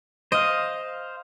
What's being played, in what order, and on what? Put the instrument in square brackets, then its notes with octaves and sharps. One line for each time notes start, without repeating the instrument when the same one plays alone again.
[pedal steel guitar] C5 F5 [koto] D#5